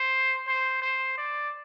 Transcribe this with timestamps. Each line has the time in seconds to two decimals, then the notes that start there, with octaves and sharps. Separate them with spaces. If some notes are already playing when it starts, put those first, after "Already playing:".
Already playing: C5
0.47 C5
0.82 C5
1.18 D5